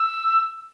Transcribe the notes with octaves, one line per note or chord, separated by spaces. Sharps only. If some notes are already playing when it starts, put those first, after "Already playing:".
Already playing: E6